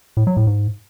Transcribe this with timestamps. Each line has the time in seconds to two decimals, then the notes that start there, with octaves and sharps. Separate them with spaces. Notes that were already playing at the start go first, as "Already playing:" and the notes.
0.17 A2
0.27 F#3
0.37 A2
0.47 G#2